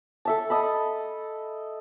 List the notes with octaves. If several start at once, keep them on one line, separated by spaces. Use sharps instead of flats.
A4 E5 A5
D#5 A5 B5